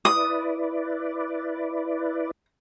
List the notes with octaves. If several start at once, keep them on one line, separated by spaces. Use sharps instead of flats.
E4 B4 D5 D#6